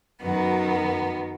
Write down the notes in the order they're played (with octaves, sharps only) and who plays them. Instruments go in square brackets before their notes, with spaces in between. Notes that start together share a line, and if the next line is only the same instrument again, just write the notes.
[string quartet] F#2 D#3 F#3 B3